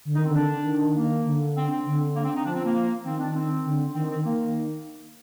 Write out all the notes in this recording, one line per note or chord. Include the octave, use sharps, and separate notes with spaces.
D3
D#4
D#3
C4
D3 D4
D#3
A#3
D3
C4
C4
D3
A#3
C4
D#4
F3 D4
C4
A#3
D#3 C4
D4
C4
D3
D#3 C4
C4
D#3 A#3